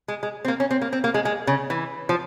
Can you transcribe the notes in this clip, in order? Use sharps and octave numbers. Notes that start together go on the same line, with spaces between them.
G#3
G#3
C4
A#3
C#4
C4
A#3
C4
A#3
G#3
G#3
C#3
E3
F3